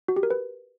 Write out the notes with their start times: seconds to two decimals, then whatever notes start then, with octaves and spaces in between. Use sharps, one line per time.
0.08 F#4
0.16 G4
0.23 A#4
0.30 B4